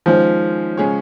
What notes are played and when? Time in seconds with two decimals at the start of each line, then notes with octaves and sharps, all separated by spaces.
0.06 D#3 F3 G#3 C#4
0.77 C#3 G#3 C#4 G#4 C#5